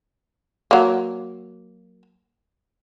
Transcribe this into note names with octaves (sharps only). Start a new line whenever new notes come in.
F#3 A#3